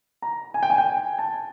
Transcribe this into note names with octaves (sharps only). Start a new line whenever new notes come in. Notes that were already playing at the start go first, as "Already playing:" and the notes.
A#5
G#5
G5
G#5
G5
G#5
A5